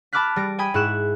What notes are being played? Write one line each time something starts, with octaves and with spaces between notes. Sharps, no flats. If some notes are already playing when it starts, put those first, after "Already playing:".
A5 B5 D6 F6 F#6 B6
G3 A#6 D7
G5 G#5 B5 D#6 G#6 B6
G#2 E4 C#6 F#6 E7